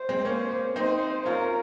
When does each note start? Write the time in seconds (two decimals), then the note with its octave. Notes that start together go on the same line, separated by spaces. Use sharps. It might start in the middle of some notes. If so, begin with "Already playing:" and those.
Already playing: C5
0.09 G#3 C4
0.25 A#3 C#4
0.75 C4 D#4 C5
1.25 C#4 F4 A#4